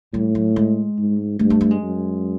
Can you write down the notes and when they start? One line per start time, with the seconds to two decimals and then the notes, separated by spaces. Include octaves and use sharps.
0.13 A2 G3
0.35 F#3
0.56 G#3
0.98 G#2
1.39 G2 A3
1.50 A3
1.61 A3
1.71 G#3
1.82 F#2